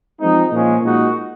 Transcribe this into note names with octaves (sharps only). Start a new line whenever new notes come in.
F3 G#3 C4 D#4
A#2 F3 G#3 C#4
A#2 G#3 D#4 F#4